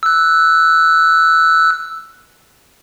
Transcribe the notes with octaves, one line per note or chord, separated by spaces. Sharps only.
E6 F#6